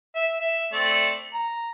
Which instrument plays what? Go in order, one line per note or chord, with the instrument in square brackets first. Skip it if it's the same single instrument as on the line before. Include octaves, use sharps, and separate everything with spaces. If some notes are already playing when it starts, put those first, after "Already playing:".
[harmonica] E5
E5
A3 C4 D5
A#5